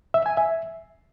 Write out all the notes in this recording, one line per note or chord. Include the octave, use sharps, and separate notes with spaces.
E5
G#5
E5